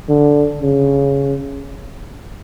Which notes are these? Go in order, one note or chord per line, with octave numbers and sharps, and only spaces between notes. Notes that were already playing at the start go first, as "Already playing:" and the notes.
D3
C#3